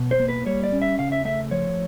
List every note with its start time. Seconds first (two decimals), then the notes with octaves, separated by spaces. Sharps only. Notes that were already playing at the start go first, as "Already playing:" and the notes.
Already playing: B2
0.11 C5
0.20 A#3
0.29 B4
0.46 G3 C#5
0.64 D5
0.72 C#4
0.82 E5
0.99 C#3 F5
1.12 E5
1.25 A3 E5
1.51 F3 C#5